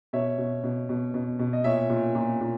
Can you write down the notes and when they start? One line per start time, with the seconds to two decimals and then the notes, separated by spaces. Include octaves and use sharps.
0.13 B2 C#5 E5
0.38 B2
0.64 B2
0.89 B2
1.14 B2
1.39 B2
1.53 D#5
1.64 A#2 C#5 E5
1.90 A#2
2.15 A#2
2.40 A#2